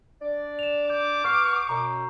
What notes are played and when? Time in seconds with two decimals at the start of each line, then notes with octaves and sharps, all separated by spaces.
0.21 D4 D5
0.59 E7 F7
0.90 D6 G6
1.24 B3 C#6 F6 C7
1.69 F#2 B2 A#5